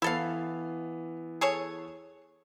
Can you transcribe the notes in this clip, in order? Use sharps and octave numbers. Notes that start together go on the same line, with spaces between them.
E3 B3 E4 A4 F5
G#4 A4 C#5